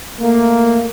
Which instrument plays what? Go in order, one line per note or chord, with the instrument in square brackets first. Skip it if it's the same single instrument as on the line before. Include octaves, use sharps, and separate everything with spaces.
[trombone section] A3 A#3